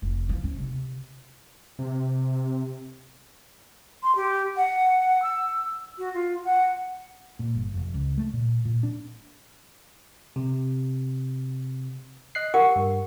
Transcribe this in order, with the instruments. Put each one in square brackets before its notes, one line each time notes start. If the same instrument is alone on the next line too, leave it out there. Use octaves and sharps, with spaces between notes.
[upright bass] F1
F3
C#4
C3
[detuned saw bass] C3
[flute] C6
G4
F#5
E6
F#4
F4
F#5
[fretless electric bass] A#2
G1
F1
C#2
A3
A#2
A#2
D4
[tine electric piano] C3
D#5 F#6 C7
[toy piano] G4 A#4 F#5 [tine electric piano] C#6
[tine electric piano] G2